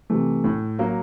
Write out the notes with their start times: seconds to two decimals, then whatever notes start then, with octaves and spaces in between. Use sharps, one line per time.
0.10 C3 E3 A3
0.44 A2
0.79 F#3 A#3